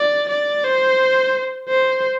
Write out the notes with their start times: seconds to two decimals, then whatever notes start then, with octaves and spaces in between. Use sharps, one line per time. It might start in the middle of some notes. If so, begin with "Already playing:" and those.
Already playing: D5
0.29 D5
0.64 C5
1.69 C5